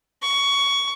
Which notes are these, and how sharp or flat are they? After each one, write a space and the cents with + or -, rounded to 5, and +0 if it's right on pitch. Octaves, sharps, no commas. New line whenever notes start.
C#6 +15